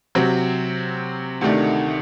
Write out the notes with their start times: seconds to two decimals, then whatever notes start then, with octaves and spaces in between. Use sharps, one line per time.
0.15 C3 F#3 C4
1.41 D2 C3 D#3 A3 D4